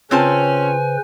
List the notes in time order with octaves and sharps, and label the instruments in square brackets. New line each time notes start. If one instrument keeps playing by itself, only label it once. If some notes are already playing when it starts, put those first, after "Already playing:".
[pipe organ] C#3 B4 C5 [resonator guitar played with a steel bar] C4 F4 A5 [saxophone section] C#4 [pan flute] G#5